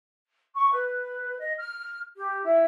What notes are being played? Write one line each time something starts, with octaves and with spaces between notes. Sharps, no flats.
C#6
B4
D#5
F6
G4
E4